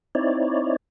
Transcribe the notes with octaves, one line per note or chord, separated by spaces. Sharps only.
C4 D#4 E4 C#5 D5